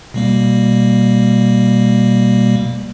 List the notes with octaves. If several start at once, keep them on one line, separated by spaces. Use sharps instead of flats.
B2 G3 A#3